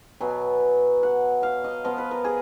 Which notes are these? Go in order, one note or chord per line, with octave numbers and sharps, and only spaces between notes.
B2 F#3 B3 G#5
F#5
F5
D#5
F3 B3 D#5
B4
A#4
G#4